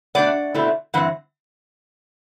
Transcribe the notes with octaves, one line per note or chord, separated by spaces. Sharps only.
B2 A3 D4 D5 F#5
B2 A3 C4 E4
G2 E3 C4 F#5